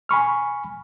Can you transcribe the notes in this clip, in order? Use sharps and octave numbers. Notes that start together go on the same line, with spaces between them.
G#5 B5 C#6 F6